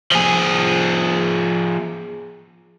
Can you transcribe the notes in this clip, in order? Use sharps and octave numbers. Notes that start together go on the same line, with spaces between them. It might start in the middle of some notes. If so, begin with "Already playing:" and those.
F3 G#4